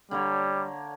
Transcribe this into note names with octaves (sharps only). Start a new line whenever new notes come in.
D3 G3 A#3 C#5